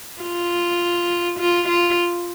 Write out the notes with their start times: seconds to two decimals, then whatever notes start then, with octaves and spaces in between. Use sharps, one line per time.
0.22 F4
1.39 F4
1.68 F4